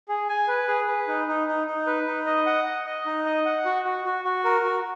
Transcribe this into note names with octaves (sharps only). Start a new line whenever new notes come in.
G#4
G#5
B4
G#4
B4
D#4
D#4
D#4
D#4
B4
D#4
D#5
F#5
D#5
D#5
D#4
D#5
F#5
F#4
F#4
F#4
F#4
A#4
F#4